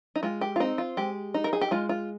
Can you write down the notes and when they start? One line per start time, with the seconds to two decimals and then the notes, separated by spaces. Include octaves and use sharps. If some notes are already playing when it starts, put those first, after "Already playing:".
0.16 D#4
0.23 G#3 F4
0.41 G4
0.56 F4
0.60 C4 D#4
0.78 F4
0.97 G#3 G4
1.34 D#4
1.44 A#4
1.53 G#4
1.61 G4
1.71 G#3 F4
1.89 F4